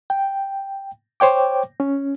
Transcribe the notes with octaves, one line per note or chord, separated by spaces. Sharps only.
G5
C5 C#5 G5 D6
C#4